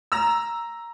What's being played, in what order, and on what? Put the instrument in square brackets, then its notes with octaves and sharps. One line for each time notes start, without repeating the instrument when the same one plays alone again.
[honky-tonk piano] A#5 E6